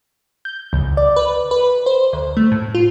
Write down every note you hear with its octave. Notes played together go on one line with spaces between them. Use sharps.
G6
C#2
D5
B4
B4
C5
D2
A3
A2
F4